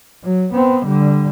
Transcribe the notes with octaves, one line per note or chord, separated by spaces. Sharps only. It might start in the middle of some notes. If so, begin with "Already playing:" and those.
F#3
B3 C4
D3 G3